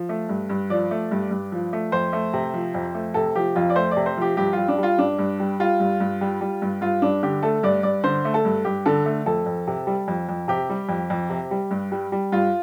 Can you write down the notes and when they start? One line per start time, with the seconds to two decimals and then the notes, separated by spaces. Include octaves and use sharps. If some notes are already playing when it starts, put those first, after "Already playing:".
Already playing: F3
0.09 A3
0.29 G2
0.49 G2
0.70 F3 D5
0.91 A3
1.11 G2
1.31 G2
1.52 F3
1.73 A3
1.92 F2 C5
2.13 A3
2.33 C3
2.54 F3
2.74 F2
2.95 A3
3.14 C3 A4
3.35 F3 G4
3.56 F2 F4
3.70 D5
3.76 A3 C5
3.91 D5
3.97 C3
4.06 C5
4.17 F3 G4
4.37 G2 G4
4.53 G3 F4
4.68 D4
4.78 G3 F4
4.98 G2 D4
5.19 G2
5.40 G3
5.60 G3 F4
5.80 G2
6.00 G2
6.21 G3
6.41 G3
6.62 G2
6.81 G2 F4
7.02 G2 D4
7.23 D3 G4
7.43 A3 A4
7.63 G2 D5
7.83 G2 D5
8.04 D3 C5
8.25 A3
8.34 A4
8.45 G2
8.65 G2 G4
8.86 D3 A4
9.06 A3
9.26 F2 A4
9.46 F2
9.67 C3
9.87 G3
10.08 F2
10.29 F2
10.48 C3 G4
10.69 G3
10.89 F2
11.10 F2
11.29 C3
11.51 G3
11.71 G2
11.92 G3
12.12 G3
12.32 G2 F4